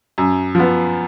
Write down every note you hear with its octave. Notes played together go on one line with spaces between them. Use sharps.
F#2
F3 B3